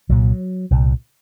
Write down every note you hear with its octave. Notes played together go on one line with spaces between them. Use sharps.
C2 A#2 F#3
C2 A#2